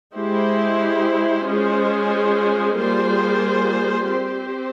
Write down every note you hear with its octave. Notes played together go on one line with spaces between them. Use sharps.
G#3 E4 G4 C5
G#3 C#4 F4 G#4 C5
G3 A#3 F4 G#4 C5
C4 G4 C5